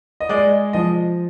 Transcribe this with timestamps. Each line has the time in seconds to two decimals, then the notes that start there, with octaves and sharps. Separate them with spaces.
0.20 D#5
0.29 G#3 D5
0.73 F3 D#5